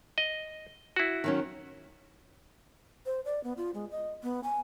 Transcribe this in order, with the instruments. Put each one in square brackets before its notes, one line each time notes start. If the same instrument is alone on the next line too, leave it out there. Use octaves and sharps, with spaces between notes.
[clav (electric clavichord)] D#5
E4 F#4
[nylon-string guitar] D#3 F#3 C#4
[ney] C5
D5
B3
F4
G#3
D#5
B3
G#5